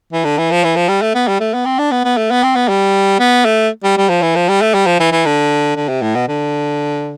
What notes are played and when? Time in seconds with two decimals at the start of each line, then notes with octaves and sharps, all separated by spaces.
0.13 E3
0.25 D3
0.38 E3
0.51 F3
0.64 E3
0.76 F3
0.89 G3
1.02 A3
1.15 B3
1.28 G3
1.41 A3
1.54 B3
1.66 C4
1.79 D4
1.92 B3
2.05 B3
2.17 A3
2.31 B3
2.43 C4
2.56 B3
2.69 G3
3.20 B3
3.45 A3
3.84 G3
3.98 G3
4.09 F3
4.22 E3
4.36 F3
4.49 G3
4.62 A3
4.74 G3
4.86 F3
5.00 E3
5.12 E3
5.26 D3
5.76 D3
5.89 C3
6.02 A2
6.15 B2
6.28 D3